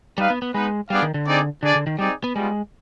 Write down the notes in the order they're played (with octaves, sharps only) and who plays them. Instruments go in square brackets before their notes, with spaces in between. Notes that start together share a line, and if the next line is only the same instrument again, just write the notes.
[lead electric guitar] G3 [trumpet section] D#4 B4 F5
[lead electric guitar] B3
B3
[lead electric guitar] G#3 [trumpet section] B3 D#4 B4
[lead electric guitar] G3 [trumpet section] B3 D4 G#4 D5 F5
[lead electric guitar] D#3
D3
[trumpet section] C4 D#4 G#4 D5
[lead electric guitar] D3 [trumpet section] D4 G#4 D5
[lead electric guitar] D3
D#3
[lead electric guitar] G3 [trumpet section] C4 D#4 G#4 D5
[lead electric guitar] B3
[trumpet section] G3 B3 F4 [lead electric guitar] G#3